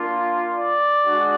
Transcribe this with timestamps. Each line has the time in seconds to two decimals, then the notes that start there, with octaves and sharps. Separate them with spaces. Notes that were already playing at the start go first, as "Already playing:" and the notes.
Already playing: A#3 D4 F4
0.53 D5
1.05 G#3 D4 F#4